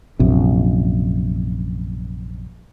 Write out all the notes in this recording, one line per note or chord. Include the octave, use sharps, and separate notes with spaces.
A#1 F#2 C3